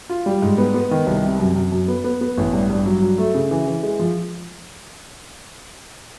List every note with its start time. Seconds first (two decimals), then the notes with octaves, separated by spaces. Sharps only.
0.09 F4
0.26 G3
0.42 G#2
0.58 B3
0.74 B3
0.91 D#3
1.07 C2
1.23 C3
1.40 F#2
1.56 F#2
1.72 F#2
1.88 B3
2.04 B3
2.21 B3
2.37 A1
2.54 G2
2.70 G2
2.86 F#3
3.02 F#3
3.18 A3
3.34 C#3
3.51 E3
3.68 E3
3.83 G#3
3.99 F3